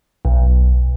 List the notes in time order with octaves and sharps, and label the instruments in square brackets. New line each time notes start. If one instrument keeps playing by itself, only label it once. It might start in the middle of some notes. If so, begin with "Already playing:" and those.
[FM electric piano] B1